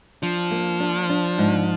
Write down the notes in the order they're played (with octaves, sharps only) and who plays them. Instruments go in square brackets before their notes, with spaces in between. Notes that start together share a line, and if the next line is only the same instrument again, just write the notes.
[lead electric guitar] F3 [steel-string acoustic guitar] D4
[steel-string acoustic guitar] A#3
D4
D4
G#2